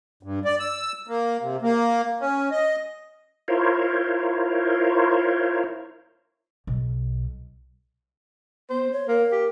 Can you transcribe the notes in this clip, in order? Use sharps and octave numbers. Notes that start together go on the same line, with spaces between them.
G2
D5
E6
A#3
C3
A#3
C#4
D#5
E4 F4 A#4 C5 C#5
B1
B3 C5
C#5
A#3 A#4
G4